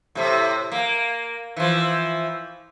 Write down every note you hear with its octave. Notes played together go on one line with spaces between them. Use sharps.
A2 C3
A#3
E3 F3